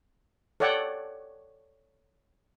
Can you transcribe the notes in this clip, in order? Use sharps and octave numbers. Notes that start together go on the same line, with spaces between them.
A4 C#5 D5 F#5 G5